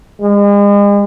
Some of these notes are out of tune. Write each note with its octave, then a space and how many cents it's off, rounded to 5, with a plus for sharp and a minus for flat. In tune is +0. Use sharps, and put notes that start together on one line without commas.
G#3 -40